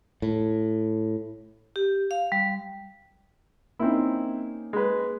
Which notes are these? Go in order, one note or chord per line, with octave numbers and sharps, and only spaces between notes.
A2
G4
F5
G3
A#3 C4 C#4 D#4 E4
G#3 B4